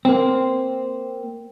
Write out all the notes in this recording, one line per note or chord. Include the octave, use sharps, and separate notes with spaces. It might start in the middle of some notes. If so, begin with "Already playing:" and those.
A#3 C4